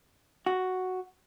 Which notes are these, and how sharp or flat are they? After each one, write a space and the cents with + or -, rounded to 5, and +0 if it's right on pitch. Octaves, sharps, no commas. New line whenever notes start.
F#4 +0